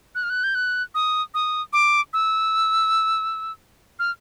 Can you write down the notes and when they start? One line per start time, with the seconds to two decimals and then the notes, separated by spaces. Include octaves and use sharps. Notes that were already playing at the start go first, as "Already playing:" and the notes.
0.15 F#6
0.23 F6
0.30 F#6
0.44 G6
0.55 F#6
0.95 D#6
1.34 D#6
1.73 D6
2.13 E6
3.99 F6